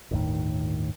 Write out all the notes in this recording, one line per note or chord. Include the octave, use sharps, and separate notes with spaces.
G1 D#2 A2 D#3